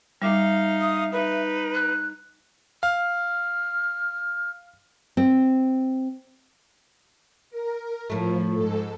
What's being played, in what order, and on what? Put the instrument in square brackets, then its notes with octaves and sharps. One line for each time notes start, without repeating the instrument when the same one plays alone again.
[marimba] G3 D6 [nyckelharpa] D#4 F5 [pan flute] E5
[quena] D#6
[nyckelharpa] D#4 [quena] B4
[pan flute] F#6
[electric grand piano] F5 [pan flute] F6
[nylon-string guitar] C4
[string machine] A#4
[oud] A2 A3 [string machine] F3
[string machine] G#2 A4